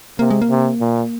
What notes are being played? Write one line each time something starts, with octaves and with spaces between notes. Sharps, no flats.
C3 A#3
G#3
A#3
C3
A#2